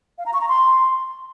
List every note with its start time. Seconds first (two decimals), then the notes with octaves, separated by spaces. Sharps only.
0.18 F5
0.26 A#5
0.33 C#6
0.41 A#5
0.49 C6